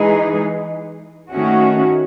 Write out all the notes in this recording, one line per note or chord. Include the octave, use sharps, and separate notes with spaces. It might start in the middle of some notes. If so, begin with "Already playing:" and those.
Already playing: E3 G#3 D#4 G#4
D#3 A3 C#4 F#4